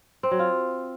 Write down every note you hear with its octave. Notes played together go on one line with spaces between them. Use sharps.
C4
F#3
F4